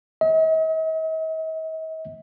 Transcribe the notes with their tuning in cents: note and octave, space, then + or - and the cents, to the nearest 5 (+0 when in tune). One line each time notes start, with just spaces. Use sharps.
D#5 +45